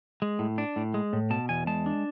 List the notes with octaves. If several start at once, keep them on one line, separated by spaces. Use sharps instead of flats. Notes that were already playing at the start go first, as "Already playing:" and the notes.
G#3
A2
D4
A2
G#3
A2
B2 A5
E2 G#5
G#3 A5
D4